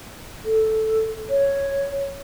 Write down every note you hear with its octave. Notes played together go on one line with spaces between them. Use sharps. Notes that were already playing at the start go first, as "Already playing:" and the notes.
A4
C#5